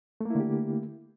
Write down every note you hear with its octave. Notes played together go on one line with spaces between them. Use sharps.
D3 A3 A#3 E4 G4